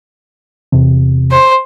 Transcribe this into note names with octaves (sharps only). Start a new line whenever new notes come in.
E2 C3
C5